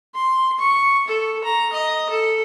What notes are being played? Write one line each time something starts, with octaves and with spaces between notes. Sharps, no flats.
C6
C#6
A4
A#5
D#5
A4